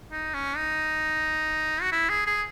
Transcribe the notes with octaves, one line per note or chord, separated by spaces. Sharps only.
D#4
C#4
D#4
F#4
E4
G#4
G#4